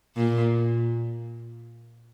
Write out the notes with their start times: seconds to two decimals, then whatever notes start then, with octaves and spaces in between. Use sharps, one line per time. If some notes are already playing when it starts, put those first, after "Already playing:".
0.16 A#2